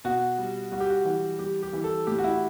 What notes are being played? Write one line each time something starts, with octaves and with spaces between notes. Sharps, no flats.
B2 F#4
G3
G3 F#4
G4
F#4
E3
G3 G4
G4
E3
A4
A2 G4
F#4
E4